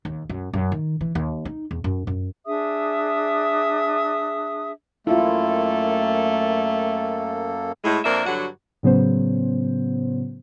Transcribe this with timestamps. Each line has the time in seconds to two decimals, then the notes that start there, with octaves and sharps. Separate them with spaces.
0.05 D#2
0.29 F#2
0.53 F#2
0.72 D#3
1.01 E3
1.15 D#2
1.45 D#4
1.71 E2
1.84 F#2
2.07 F#2
2.46 D4 G#4 E5 D#6
5.07 F#2 A3 A#3 E4 F4 A4
7.84 A2 G#3
8.04 F2 A#3 D4 A#4 C5 E5
8.25 G2 D3 F#3 F#4
8.83 A2 C#3 F#3 B3 C#4 C5